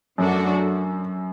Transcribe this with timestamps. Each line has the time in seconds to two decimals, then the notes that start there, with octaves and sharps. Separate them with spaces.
0.18 F#2 F#3 A3 D4 F#4 A4